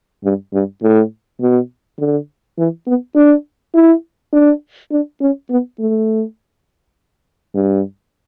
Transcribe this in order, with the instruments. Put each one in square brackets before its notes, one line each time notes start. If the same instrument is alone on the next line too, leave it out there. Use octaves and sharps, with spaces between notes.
[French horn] G2
G2
A2
B2
D3
E3
B3
D4
E4
D4
D4
C#4
B3
A3
G2